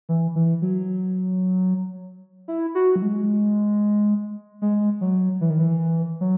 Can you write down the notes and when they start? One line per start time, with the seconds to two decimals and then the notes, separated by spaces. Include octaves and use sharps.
0.09 E3
0.36 E3
0.62 F#3
2.48 E4
2.75 F#4
2.96 F#3
3.02 G#3
4.62 G#3
5.01 F#3
5.41 E3
5.50 D#3
5.59 E3
6.21 F#3